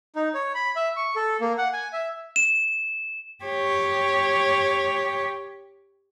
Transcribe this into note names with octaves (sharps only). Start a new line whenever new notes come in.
D#4
C#5
B5
E5
C#6
A4
A#3
F#5
G#5
E5
E7
G4 C#5